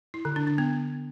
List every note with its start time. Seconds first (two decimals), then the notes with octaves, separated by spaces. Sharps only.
0.14 E4
0.25 D3
0.36 D4
0.47 D4
0.58 B3